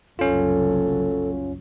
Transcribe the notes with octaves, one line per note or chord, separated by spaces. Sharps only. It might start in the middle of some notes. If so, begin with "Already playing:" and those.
F#1 C2 F#3 C#4 F4 A4